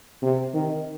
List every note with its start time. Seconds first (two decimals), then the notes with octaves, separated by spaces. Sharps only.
0.22 C3
0.54 D#3